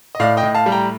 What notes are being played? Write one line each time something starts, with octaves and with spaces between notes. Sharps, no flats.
D#5
A2 D5 F5
D#5 G5
A2
F5 A5
G3
G5 A#5